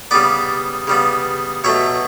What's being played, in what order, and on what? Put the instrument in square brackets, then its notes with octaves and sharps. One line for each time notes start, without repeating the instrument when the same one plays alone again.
[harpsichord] C#3 G3 B3 B4 D5
C#3 G3 B3
B2 F#3 A3 C#5 E5